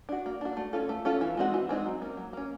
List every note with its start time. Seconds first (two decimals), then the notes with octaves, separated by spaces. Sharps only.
0.09 D4 F#4
0.26 A#3
0.41 D4 F#4
0.57 A3
0.73 C#4 F4 A4
0.89 A3
1.05 C#4 F4 A4
1.21 E3
1.37 G#3 C4 D#4 F#4
1.54 E3
1.69 G#3 C4 D#4 F#4
1.86 F#3
2.01 A#3 C#4
2.17 F#3
2.33 A#3 C#4